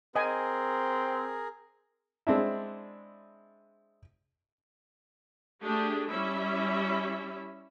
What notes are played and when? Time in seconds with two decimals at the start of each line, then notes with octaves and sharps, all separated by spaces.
0.16 C4 G#4 A#4 D#5 G#5
2.27 G#3 C4 D4 E4
5.64 A3 D4 G4 G#4
6.10 G3 C#4 E4 E5